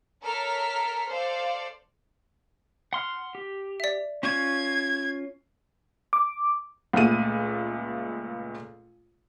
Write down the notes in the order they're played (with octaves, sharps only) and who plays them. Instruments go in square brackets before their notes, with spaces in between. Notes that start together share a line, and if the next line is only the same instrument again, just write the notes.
[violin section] A4 A#4 C#5 A#5 F6 B6
A4 C5 D5 F5
[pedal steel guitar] F#5 C6 F6
G4
[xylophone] D5 E5
[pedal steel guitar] C#4 F4 C#6 [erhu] G#6
[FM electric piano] D6
[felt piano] C#2 A#2 A3 D#7